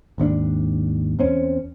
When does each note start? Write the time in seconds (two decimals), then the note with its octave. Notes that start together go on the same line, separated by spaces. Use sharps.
0.18 G#1 D#2 C#4 D4
1.19 E2 C4 C#4